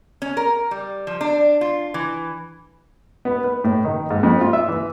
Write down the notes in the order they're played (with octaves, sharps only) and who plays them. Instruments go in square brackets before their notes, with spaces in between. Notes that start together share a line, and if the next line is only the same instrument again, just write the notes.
[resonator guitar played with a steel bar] C#4
A#4
G3
F3
D4
F4
E3
[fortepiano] B3
B4
A2
D#3
G#2
F2
F4
E5
E3